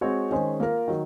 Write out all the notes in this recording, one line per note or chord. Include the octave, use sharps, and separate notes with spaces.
G#3 C4 F#4 C#5
D#3 G#3 C#4 G#4 C5
A#3 F4 A#4
D#3 F#3